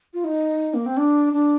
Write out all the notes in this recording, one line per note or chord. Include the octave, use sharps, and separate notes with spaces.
F4
D#4
A#3
C4
D4
D4